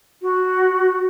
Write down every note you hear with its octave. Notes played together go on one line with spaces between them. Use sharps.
F#4